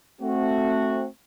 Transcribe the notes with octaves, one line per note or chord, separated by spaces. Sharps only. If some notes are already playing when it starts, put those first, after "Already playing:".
A3 C4 F#4